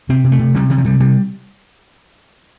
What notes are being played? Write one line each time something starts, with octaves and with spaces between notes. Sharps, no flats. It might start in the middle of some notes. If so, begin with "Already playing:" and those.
C3 C4
C3
A3
C3
C3 G3
C3 D#3
F3
C3 G3
C3 G3